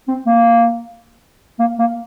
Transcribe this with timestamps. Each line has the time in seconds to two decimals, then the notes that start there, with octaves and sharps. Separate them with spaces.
0.08 C4
0.26 A#3
1.59 A#3
1.79 A#3